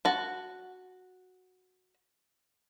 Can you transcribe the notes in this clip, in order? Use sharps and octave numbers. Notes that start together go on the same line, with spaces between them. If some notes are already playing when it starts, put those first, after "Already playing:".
F#4 A5